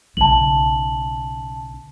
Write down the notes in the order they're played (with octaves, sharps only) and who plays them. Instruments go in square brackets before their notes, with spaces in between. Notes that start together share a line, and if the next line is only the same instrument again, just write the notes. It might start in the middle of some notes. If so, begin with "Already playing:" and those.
[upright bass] B1 C#3 [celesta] A5 F#7